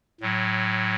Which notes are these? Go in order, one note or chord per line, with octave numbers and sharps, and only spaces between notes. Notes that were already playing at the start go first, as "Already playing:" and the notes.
A2 F#3